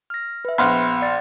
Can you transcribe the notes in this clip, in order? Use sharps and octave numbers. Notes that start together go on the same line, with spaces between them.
F6 A#6
B4 E5
A#1 B3 F5 B5 C6 F#6
D5 A6